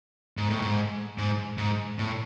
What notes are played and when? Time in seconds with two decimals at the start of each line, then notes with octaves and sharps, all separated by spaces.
0.37 G#2
0.50 A2
0.62 G#2
1.18 G#2
1.58 G#2
1.99 A2